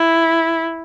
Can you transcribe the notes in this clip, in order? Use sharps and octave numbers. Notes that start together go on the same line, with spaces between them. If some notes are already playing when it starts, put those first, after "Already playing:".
Already playing: E4